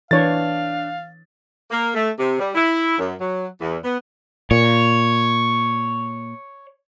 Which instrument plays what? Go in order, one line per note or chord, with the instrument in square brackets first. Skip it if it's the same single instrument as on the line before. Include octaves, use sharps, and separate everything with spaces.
[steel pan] E3 C#5 [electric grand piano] D4 A6 [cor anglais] F5
[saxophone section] A#3
A3
C3
G3
E4
F#2
F#3
E2
B3
[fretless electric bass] A#2 [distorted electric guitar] C#5